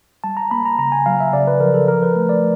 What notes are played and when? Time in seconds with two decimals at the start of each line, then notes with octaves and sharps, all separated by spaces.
0.24 G3 A5
0.37 A#5
0.51 A#3 B5
0.65 A#5
0.79 C#3 A#5
0.92 G#5
1.06 F#3 F5
1.20 E5
1.33 C#3 D5
1.47 B4
1.60 F3 A#4
1.74 A4
1.88 F3 A#4
2.03 B4
2.16 A3
2.29 D5